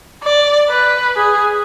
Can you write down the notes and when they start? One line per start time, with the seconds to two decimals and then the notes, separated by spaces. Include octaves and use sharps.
0.23 D5
0.69 B4
1.16 G#4